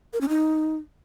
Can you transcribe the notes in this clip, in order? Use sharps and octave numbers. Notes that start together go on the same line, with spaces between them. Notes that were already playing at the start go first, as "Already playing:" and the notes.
A#4
C#4
D#4